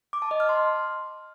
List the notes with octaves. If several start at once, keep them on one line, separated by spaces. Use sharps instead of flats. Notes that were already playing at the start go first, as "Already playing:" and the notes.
D6
A5
D#5
F6
C6